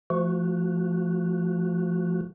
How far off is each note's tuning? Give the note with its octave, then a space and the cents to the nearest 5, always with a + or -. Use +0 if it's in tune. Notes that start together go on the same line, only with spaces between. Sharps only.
F3 -20 A3 -5 F#4 +0